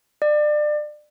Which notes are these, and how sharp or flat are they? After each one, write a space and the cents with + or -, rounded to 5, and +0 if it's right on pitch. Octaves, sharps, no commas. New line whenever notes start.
D5 +30